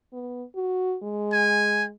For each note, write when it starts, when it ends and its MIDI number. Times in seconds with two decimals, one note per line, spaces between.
0.12 0.44 59
0.55 0.96 66
1.03 1.93 56
1.33 1.84 80